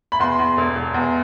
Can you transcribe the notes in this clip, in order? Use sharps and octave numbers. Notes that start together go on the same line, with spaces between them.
B5
E2 C6
E2
E1
E1
E2